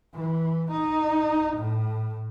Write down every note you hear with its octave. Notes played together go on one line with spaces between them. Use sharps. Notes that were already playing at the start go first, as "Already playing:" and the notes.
E3
D#4
A2